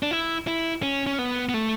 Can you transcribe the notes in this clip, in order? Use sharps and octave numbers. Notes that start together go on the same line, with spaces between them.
D4
E4
E4
C#4
C#4
B3
B3
A3